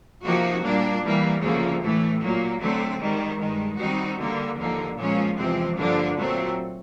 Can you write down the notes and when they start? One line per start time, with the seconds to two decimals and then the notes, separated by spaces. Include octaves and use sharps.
0.23 C3 F3 A#3 D#4 F#4
0.62 A#2 G3 A#3 D4
1.02 E3 G3 A#3
1.41 D2 C#3 F3 A#3
1.80 A2 E3 A3
2.21 A#2 F#3 A#3
2.60 D3 F#3 A3 C4
2.99 G#2 D#3 G3
3.39 G2 D#3 G#3
3.78 D#3 G3 C4 D#4 F#4
4.18 D3 G3 A#3
4.57 D#2 D3 F3 A#3
4.96 A#2 F3 G#3 C#4 F4
5.36 E2 C3 F3 G#3 C4
5.76 G2 D3 F3 A#3 D4
6.15 A#2 F#3 A3 C4